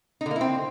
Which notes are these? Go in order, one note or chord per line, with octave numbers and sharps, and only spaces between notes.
D#4
D3
A#3
E4
C4